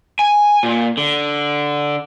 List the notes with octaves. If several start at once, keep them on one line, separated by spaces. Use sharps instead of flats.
G#5
A#2
D3